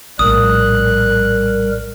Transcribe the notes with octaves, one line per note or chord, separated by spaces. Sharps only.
A#1 A2 G3 A#4 D#6 F#6